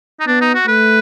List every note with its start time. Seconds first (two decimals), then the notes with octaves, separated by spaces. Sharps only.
0.20 D#4
0.27 B3 D4
0.41 D#4
0.54 F#4
0.67 A3 B4